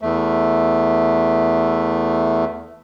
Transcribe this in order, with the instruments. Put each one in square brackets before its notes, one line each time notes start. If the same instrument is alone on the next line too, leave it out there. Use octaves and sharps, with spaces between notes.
[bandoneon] E2 A3